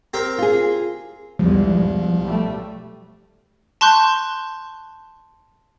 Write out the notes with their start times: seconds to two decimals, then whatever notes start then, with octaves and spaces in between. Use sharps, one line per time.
0.14 C4 G4 A#4
0.38 F4 G#4
1.39 B1 E2 F3 G3 G#3
1.79 E2
2.21 B1 G3 A3
3.81 A5 C6 C#6 F#6 G6